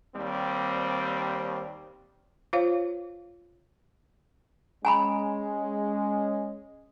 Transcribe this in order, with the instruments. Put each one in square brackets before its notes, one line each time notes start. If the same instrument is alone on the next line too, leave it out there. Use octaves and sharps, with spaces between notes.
[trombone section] D#2 G3 C4
[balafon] F4 C5 C#5 F5
[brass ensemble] G#3 C#4 [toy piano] G#5 A#5 B5